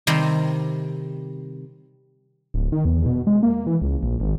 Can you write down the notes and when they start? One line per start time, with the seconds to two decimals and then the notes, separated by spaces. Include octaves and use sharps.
0.07 C3 D#3 G3 C4 C6
2.54 D1
2.72 D#3
2.85 E2
3.06 B2
3.27 G#3
3.43 A#3
3.67 E3
3.82 C#2
4.03 A#1
4.20 G#1